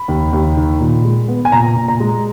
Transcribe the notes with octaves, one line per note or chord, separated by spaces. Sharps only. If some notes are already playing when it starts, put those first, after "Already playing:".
Already playing: B5
D#2
D#2
D#3
A#2
G#3
B3
G#5
A#2 A#5
A#2
A#5
G#3